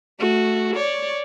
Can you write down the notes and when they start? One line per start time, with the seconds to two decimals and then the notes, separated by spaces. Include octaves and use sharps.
0.19 A3 F#4
0.76 C#5 D5